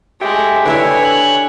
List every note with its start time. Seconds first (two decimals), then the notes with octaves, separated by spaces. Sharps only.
0.21 G#3 A3 G4 E5 G5
0.65 D3 E4 B4 C#5 E5 G#5
1.05 F#6